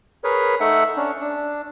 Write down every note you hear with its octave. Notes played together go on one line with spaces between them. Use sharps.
G#4 A#4 B4 C#5
A3 D#4 A4 E5 F#5
C#4 D4
D4